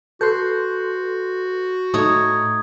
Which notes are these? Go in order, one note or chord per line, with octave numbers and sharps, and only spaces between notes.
F#4 A4 B4 C6 F#6 G6
A2 A3 D#4 C#5 C#6 D#6 G#6